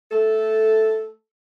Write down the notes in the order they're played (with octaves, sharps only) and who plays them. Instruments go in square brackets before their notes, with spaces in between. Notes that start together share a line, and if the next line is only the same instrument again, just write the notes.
[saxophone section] A3 A4